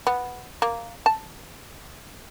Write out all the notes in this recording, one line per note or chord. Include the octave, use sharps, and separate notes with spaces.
B3
A#3
A5